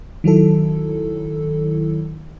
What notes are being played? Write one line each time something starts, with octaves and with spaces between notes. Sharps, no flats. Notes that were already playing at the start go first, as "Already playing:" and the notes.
D#3 F#3 E4 A4